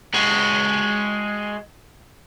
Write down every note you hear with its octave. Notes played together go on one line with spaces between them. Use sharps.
G#3 F#4